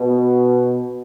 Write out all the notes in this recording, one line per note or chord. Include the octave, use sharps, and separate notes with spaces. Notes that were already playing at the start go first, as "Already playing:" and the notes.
Already playing: B2